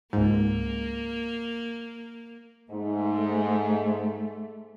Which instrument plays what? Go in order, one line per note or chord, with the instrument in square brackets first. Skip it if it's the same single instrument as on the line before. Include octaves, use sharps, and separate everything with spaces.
[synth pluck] C#2 G#2 [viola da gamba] A#3
[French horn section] G#2 [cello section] A3